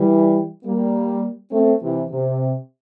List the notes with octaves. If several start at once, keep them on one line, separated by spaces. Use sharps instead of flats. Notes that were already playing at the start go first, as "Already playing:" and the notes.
Already playing: E3 G3
G3 A#3
A3 C4
C3 E3
C3